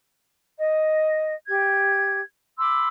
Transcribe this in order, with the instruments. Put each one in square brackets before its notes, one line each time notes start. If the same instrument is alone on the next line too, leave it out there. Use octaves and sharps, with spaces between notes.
[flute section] D#5
G4 G#6
B5 C6 D6 E6